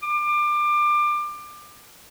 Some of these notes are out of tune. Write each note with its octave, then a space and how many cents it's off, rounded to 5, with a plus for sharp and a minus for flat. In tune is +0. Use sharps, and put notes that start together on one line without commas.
D6 +25